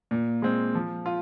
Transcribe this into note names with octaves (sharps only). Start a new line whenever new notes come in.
A#2
G#3 C4
F3
F4